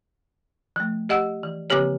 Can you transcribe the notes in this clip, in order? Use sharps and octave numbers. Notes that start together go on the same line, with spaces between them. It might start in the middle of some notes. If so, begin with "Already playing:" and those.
F3 A3
G4 D#5 F#5 E6
E3
C#3 F3 A#3 C4 G4 C#5